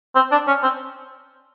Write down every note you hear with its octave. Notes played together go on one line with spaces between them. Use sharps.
C4
D4
C#4
C4